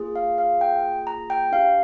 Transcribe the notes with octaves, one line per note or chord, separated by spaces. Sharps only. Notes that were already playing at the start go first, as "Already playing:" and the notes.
Already playing: A#3 F4 G#4
F5
F5
G5
A#5
G5
D4 G4 F5